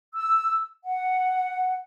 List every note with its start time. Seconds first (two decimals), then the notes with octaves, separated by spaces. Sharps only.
0.14 E6
0.85 F#5